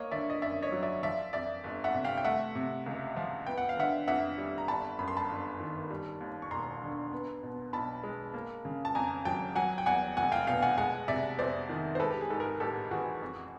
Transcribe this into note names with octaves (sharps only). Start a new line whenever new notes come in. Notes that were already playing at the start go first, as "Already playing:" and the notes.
Already playing: A#3 C#5 D#5
D3 D5 E5
D#5
F#2 D5 E5
C#5 D#5
F#3
D5 E5
F3 D5 E5
F2 D5 E5
G1
E5 F#5
C3
F5 G5
G5
A3 E5 F#5
C3
C#2
F3
B3 G5
F#5
F5
D3 E5 F#5
F2 E5 F#5
G3
A#5
G1 A5 B5
F#2 B5
C6
A5 B5
G1
D#3
G3
D#2
C#6
E1 A#5 C6
D3
B3
B2
B1 A5 B5
G#3
A#3
C#3
A5
F2 G#5 A#5
F#3 G5 A5
F#3 F#5 G#5
G5
E2 F#5 G#5
F1 F#5 G#5
F5 G5
B2 F5 G5
F#5 G#5
G#3 F#5 G#5
C3 D5 E5
F2 C5 D5
D#3
C5
G#3 A4 B4
G4
G#4
G#2 A4
G#4 A#4
A1 G4 A4
E3 F#4 G#4
F2